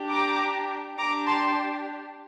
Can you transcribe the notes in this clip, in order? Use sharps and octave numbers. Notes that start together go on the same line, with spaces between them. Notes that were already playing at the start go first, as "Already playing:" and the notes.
Already playing: D4 G4
A#5 D6
D4 G4 A#5 D6
A5 C6